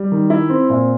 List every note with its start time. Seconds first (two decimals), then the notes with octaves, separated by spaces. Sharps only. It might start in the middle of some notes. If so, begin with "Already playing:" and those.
Already playing: G3
0.12 D#3
0.30 E4
0.50 C4
0.69 A#2